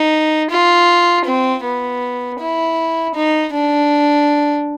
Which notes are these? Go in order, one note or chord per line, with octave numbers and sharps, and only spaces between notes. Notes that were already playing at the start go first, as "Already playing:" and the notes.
Already playing: D#4
F4
C4
B3
E4
D#4
D4